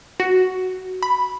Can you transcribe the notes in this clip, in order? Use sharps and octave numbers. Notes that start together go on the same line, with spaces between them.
F#4
B5